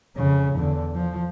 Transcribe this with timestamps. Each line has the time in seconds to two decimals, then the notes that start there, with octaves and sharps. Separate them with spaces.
0.16 F2 C#3
0.55 E2 D3
0.95 F3